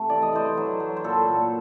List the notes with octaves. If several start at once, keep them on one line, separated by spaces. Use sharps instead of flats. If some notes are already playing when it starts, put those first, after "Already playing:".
Already playing: C3 A3
E3 D5
D#5
E3 C5 D5
F#3
F#3
C5
A#2 A4 B4
A#2